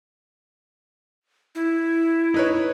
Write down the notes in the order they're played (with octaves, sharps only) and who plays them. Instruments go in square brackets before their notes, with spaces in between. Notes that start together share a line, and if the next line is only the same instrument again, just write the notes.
[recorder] E4
[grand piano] D#4 B4 C#5